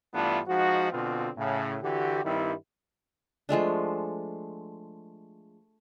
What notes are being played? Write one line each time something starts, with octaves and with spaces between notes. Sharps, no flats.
G2 E3 A3 B3 D4 F4
F3 G#3 D#4 F#4
B2 D3 B3 C4 F4
A2 C#3
D3 E3 F#4 G4
G2 D#3 G3 C4 E4
F3 G#3 A3 D4